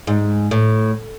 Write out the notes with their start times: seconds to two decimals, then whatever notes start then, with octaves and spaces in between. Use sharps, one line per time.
0.07 G#2
0.51 A2